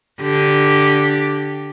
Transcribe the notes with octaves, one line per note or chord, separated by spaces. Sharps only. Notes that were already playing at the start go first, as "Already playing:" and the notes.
D3 G4